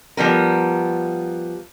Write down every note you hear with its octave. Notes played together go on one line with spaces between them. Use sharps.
F3 G3 B3 A#4